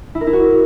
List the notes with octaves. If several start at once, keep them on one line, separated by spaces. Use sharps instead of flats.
E4
A#4
E4
F#4